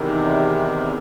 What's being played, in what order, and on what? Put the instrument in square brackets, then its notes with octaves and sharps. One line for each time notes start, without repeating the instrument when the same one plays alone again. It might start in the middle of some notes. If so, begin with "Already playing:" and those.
Already playing: [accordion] E2 C3 D#3